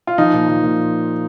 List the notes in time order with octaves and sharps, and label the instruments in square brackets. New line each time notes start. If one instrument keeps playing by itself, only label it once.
[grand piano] F4
F3 D#4
A#2
F3
A#2